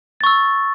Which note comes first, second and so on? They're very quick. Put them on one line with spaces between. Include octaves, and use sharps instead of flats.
A6 C#6 E6